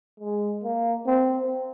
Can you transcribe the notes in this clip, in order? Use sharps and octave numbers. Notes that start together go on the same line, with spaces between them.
G#3
A#3
C4